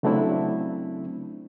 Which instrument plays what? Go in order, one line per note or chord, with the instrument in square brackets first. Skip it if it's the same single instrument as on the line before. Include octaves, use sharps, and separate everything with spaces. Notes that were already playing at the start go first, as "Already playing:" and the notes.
[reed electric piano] C#3 F#3 A3 C4 D4 E4